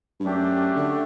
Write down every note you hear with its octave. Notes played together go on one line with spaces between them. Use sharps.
G2
F#2 A3 D4 G4
D3